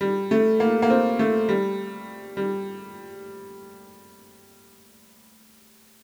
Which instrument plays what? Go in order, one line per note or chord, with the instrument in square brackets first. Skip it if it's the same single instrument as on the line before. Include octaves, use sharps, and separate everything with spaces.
[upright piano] G3
A3
A#3
A#3
C4
A3
G3
G3